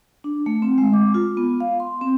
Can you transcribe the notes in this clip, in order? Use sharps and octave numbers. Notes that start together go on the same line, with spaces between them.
D4
A3
C4
G#3
D6
F4
B3
F5
C6
C4